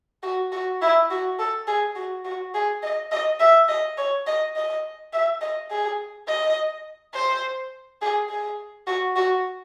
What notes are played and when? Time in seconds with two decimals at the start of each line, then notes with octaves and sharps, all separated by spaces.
0.23 F#4
0.52 F#4
0.82 E4
1.10 F#4
1.39 A4
1.67 G#4
1.96 F#4
2.25 F#4
2.54 G#4
2.83 D#5
3.12 D#5
3.40 E5
3.68 D#5
3.97 C#5
4.27 D#5
4.56 D#5
5.13 E5
5.41 D#5
5.71 G#4
6.28 D#5
7.14 C5
8.01 G#4
8.29 G#4
8.87 F#4
9.16 F#4